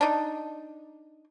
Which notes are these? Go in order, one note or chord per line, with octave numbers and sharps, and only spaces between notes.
D4 D#4